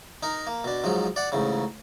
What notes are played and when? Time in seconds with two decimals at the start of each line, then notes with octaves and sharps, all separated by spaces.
0.23 D#4 A#4
0.47 A#3
0.64 B2 D4
0.84 G#2 F3 F#3 G#3
1.16 D5 F#5
1.32 A1 G#2 C#3